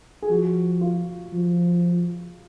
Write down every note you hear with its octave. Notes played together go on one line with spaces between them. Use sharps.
G#4
F3 F#4
F4
F3